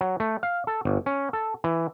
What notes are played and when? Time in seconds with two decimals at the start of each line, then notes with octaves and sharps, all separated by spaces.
0.01 F#3
0.20 A3
0.43 F5
0.67 A4
0.85 G1
1.06 C#4
1.33 A4
1.64 E3